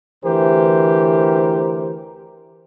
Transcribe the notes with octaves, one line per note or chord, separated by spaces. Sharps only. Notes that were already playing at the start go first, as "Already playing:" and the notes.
D2 E3 G4 A#4 C5